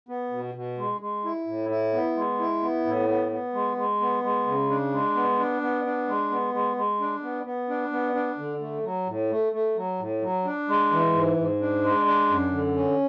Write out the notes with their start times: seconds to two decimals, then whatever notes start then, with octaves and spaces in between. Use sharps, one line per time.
0.09 B3
0.31 B2
0.55 B2
0.78 G#3
1.00 G#3
1.25 E4
1.46 A2
1.70 E4
1.93 B3
2.16 G#3
2.39 E4
2.62 B3
2.86 A2
3.09 B3
3.31 B3
3.54 G#3
3.77 G#3
4.01 B3
4.23 G#3
4.46 C#3
4.69 D4
4.92 G#3
5.15 B3
5.39 D4
5.61 B3
5.85 D4
6.08 G#3
6.31 B3
6.54 G#3
6.76 G#3
7.00 D4
7.23 B3
7.45 B3
7.69 D4
7.92 B3
8.14 D4
8.38 D3
8.61 A3
8.84 F#3
9.07 A2
9.30 A3
9.53 A3
9.76 F#3
10.00 A2
10.22 F#3
10.45 D4
10.68 G#3
10.91 E3
11.14 G#2
11.37 G#2
11.61 D4
11.83 G#3
12.06 D4
12.29 F#2
12.52 D3
12.75 C#4